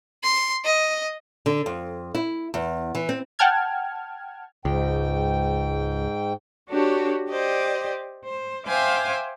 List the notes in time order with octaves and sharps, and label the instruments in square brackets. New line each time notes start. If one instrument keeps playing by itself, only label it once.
[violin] C6
D#5
[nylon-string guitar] D3
F2
E4
E2
E3
C4
[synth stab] F#5 G5 A5 F6 G#6
[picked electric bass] C#2 [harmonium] G#2 G5
[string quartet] D4 F#4 G4 A4 C#5
G4 C5 D5 D#5
C5
C5 E5 F5 G5 G#5 D6